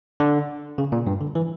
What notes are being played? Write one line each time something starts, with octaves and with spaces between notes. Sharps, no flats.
D3
C#3
A#2
G2
D3
E3